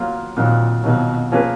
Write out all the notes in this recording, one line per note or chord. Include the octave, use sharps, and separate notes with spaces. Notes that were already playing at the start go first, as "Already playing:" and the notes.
Already playing: F#3 A#3 F4
F2 A#2 D#3 F#3
F2 B2 D#3 F#3
F3 A#3 C#4 G#4 B4